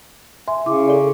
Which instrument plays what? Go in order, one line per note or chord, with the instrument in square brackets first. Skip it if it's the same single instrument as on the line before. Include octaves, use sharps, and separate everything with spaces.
[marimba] E5 G#5 C6
[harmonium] C#3 [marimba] E4 D6
[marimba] A4 D5